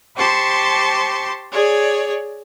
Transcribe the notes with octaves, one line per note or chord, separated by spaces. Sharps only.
G4 C5 A5 C6 C#6
G#4 C#5 D5